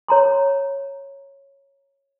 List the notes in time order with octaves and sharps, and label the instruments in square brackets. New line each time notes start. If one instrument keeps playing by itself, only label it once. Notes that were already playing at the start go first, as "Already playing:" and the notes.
[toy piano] C#5 A#5 C6